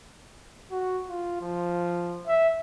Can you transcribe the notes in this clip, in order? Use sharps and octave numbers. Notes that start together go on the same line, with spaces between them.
F#4
F4
F3
E5